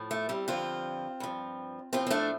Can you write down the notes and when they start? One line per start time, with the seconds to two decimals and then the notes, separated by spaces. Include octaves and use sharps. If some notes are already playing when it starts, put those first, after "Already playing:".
Already playing: A2 F3
0.11 A3
0.29 G3 C4
0.48 G2 D3 F3 C4 F4
1.20 G2 F3
1.93 A2 F3 C4 F4
2.07 C4
2.10 A3 D4